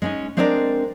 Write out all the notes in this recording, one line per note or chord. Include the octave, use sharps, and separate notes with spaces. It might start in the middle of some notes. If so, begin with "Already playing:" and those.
G#3 C#4 D#4
G#3 C4 D4 A#4 B4 D5